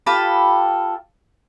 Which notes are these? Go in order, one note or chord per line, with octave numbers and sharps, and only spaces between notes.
F4 G4 A4 B5